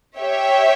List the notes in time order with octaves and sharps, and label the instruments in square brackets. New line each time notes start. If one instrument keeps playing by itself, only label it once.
[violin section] G4 C#5 E5 G5